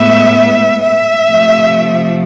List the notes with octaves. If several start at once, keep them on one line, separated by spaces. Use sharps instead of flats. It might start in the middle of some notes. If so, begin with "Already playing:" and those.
Already playing: A2 G#3 B3 E5
E5
C3 F3 A3